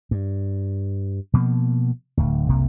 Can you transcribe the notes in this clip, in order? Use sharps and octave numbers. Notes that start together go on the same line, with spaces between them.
G2
B2 F3 A3 A#3
D1 D2
F#1 C2 C3 A#3